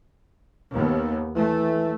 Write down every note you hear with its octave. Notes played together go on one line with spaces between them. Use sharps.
D#2 B3
E3 A3